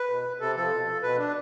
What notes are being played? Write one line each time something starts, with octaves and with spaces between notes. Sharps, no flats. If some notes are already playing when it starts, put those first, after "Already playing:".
Already playing: B4
B2
C3 A4
F3 A4
B2
B2 B4
D4